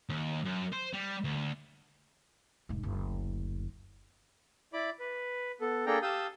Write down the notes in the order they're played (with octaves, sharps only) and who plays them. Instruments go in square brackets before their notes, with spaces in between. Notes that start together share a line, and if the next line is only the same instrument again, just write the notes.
[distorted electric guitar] D#2
F#2
C5
G3
D2
[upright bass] F1 G#2
F#1 D2
[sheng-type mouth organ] E4 D5 B5 D6
B4
B3 A4
A#3 D4 G#4 A4 G5 A#5
G4 F5 A5 D#6 E6 G6